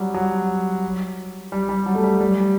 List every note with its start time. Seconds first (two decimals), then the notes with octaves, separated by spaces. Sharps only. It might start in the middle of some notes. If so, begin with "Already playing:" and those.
Already playing: F#3 G3
0.14 F#3
1.52 G3
1.69 G3
1.86 F#3
1.95 A3
2.04 G3
2.20 G3